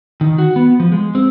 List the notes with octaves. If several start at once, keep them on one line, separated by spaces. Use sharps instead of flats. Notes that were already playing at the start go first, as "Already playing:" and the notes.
D#3
F#4
B3
F3
G#3
C4